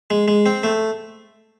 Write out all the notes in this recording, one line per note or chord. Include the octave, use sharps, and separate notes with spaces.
G#3
G#3
C4
A3